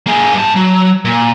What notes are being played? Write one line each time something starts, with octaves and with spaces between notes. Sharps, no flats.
A#3 G#4
G2 A5
F#3
A#2